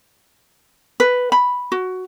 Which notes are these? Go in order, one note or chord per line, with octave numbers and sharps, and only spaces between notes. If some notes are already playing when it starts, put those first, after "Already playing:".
B4
B5
F#4